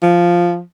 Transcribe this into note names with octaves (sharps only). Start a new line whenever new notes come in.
F3